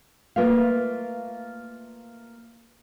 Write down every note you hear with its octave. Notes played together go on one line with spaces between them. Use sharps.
A3 A#3 F4 B4 E5 F5